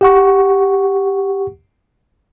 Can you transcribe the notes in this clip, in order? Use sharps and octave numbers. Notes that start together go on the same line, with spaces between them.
G4 F#5 C#6